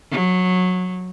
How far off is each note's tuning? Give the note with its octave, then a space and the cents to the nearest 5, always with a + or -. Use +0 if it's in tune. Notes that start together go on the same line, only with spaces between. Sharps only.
F#3 -15